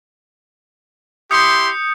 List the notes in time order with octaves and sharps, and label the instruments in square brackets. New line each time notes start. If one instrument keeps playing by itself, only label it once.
[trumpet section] E4 G4 C6 [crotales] D#6 G6 C#7